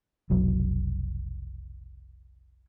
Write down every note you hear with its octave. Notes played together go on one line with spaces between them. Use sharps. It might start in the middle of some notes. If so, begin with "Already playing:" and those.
F1 B1 F#3